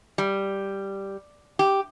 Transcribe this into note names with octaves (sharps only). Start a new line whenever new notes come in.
G3
G4